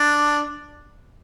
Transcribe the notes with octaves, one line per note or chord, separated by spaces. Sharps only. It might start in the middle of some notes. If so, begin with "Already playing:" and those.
Already playing: D4